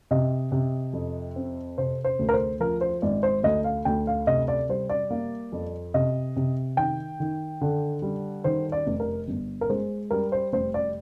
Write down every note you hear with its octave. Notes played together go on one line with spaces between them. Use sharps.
C3 D#5
C3
F2
C4
C3 C5
C5
D2
A#4
C5
F3 A#4
C5
G#1 D5
C5
D2 D#5
F5
D2 G5
F5
C3 D#5
D5
G3 C5
D5
A#3
F2
C3 D#5
C3
D#3 G5
D#3
D3
G3
D#3 C5
D5
F1
A#4
G1
A#4
G#3 C5
G3 A#4
C5
F1 C5
D5